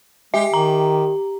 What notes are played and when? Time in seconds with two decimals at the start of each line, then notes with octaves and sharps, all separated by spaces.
0.34 G#3 G4 E5
0.54 D#3 A#5